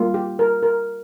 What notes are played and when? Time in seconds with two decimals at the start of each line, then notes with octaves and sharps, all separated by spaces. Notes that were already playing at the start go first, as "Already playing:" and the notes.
Already playing: G3 A#3 F4
0.14 G4
0.39 A#4
0.62 A#4